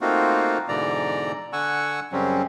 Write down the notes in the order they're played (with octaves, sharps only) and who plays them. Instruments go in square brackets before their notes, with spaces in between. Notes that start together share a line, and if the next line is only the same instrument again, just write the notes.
[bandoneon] A3 A#3 C4 D#4 F4 F#4
G#2 B2 D3 E3 D5 A#5
D3 F#5 G#5 C#6 E6
F#2 C#3 F#3 G3 C4 C#4